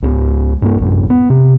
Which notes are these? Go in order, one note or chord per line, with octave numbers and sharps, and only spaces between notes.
C#2 G3 B3
G2 A#3
A1 F#2
B3
C3